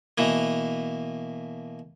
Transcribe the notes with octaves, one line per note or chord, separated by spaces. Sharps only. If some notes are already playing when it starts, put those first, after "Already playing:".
B2 E3 A#3